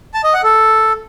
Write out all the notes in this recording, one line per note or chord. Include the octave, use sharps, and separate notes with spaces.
A5
D#5
F#5
A4